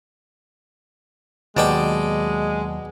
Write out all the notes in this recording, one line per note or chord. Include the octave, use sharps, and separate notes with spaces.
D#2 B2 F#3 G#3 D5 G5 A5